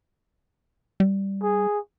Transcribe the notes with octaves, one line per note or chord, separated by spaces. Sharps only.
G3
G#4